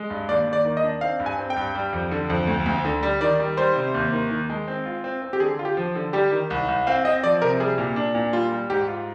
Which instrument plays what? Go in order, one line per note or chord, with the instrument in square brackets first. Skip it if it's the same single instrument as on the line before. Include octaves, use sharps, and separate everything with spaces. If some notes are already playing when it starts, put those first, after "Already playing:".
Already playing: [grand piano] G#3
G2
[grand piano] D#2 [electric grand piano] D5
[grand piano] D#2
[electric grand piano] D5
[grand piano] D#3
[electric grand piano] D#5
[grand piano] D4
[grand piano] C4 [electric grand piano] F5
[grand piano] G2
[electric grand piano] G#5
[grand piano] C4
[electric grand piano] G5
[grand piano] G2
G3
F2
D3
F2
D2
D2
D3
G3
[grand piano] D#3 [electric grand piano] D5
[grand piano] G3
[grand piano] G3 [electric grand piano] C5
[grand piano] C3
D#2
D#3
D#3
G#3
C4
F4
C4
C4
[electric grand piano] G4
[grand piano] D3 [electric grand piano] G#4
[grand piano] F4
[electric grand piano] G4
[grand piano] F3
D3
[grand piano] G3 [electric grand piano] G4
[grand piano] D#3
C2
C2
[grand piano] C4 [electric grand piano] F5
[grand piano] C4 [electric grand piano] D#5
[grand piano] F3 [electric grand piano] D5
[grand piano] C3 [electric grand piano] A#4
[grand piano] G3 [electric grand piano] G#4
[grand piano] A#2
D4
A#2
[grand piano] G3 [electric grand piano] F4
[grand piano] G3
[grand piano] G#2 [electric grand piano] G4
[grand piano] F4